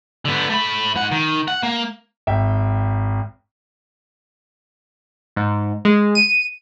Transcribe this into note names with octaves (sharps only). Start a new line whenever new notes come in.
D3 B3
A3 B5
G#2 F#5
D#3
F#5
A#3
G#1 E5 G5
G#2
G#3
D#7